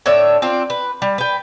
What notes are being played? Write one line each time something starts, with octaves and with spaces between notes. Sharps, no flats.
A2 D4 C#5 E5
C4 D4 F4
B4
G3
B4 G5